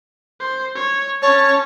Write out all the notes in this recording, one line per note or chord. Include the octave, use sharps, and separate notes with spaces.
C5
C#5
C#4 C#5 A5